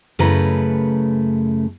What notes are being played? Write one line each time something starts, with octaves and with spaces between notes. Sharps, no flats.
F#2 C#3 A3 E4 B4 A#5